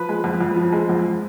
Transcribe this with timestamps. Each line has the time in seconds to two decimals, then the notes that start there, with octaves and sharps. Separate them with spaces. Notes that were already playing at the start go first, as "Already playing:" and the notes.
Already playing: F3 B4
0.09 G#3
0.24 F2
0.40 F2
0.56 F3
0.72 G#3
0.89 F2